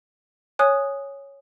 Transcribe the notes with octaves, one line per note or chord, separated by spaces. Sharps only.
C#5 G#5 D#6 F#6